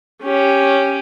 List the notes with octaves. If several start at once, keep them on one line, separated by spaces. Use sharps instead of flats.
C#4 G4